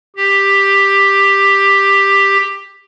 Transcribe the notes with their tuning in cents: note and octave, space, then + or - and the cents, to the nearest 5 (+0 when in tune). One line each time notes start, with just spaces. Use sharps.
G4 +10